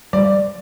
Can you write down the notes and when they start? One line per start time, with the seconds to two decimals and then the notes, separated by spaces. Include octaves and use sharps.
0.13 G3 D5